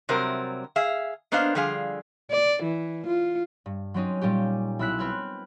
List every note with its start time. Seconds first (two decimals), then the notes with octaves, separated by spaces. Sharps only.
0.09 C3 F#3 G3 C4 A#4
0.76 G#4 E5 F5
1.32 A#3 B3 D4 C5 D#5 F5
1.55 D3 F3 G3 G#4 F5
2.31 D5
2.63 E3
3.07 F4
3.66 G2
3.94 F#3 C4 C#4 D#4
4.21 A#2 G3 C#4 G4
4.79 B1 E4 E6 F#6 B6
4.99 C4 B4 F6 G#6